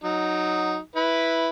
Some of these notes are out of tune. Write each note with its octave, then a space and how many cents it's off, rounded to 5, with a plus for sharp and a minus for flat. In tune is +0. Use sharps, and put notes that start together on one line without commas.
F#3 -5 D#4 +0
E4 +0 B4 +0